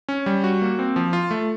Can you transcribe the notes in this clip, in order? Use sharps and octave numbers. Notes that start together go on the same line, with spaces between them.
C#4
G3
F#4
A#3
C4
F3
F4
A3